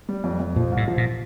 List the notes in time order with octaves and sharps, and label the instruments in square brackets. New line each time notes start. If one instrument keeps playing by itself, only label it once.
[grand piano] G3
F2
F2
[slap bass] A#2 [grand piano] F3
[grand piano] C2
[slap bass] A2
[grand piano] F3
[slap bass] A#2